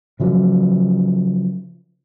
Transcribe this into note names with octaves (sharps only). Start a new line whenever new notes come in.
C#3 F3 F#3